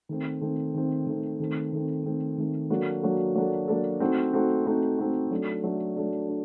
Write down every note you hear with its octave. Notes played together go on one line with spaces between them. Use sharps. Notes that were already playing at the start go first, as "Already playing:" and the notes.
D#3 A3 C4
D#3 A3 C4
D#3 A3 C4
D#3 A3 C4
D#3 A3 C4
D#3 A3 C4
D#3 A3 C4
D#3 A3 C4
F#3 A#3 D4 F#4 A4
F#3 A#3 D4 F#4 A4
F#3 A#3 D4 F#4 A4
F#3 A#3 D4 F#4 A4
A3 C4 D#4 F#4
A3 C4 D#4 F#4
A3 C4 D#4 F#4
A3 C4 D#4 F#4
F#3 A3 D4
F#3 A3 D4
F#3 A3 D4
D4